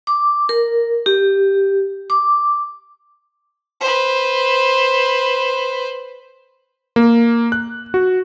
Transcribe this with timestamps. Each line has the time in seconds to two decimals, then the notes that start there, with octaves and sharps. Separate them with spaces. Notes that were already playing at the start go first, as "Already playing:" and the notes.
0.07 D6
0.49 A#4
1.06 G4
2.10 D6
3.80 B4 C5
6.96 A#3
7.52 F#6
7.94 F#4